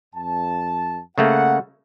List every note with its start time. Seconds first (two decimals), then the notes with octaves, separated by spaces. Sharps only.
0.14 F2 A5
1.18 C#3 A3 A#3 F#5